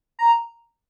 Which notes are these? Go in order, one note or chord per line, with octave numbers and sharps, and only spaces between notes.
A#5